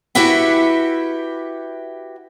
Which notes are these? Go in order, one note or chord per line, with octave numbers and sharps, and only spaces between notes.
E4 F#4 G4 B4 E5 F#5